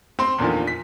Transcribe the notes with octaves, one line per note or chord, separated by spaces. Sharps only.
C4 C6
E2 A#2 D3 D#3 F3
B6